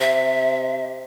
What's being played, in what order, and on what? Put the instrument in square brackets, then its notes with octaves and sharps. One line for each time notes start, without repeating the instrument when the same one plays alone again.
[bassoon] C3 [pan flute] E5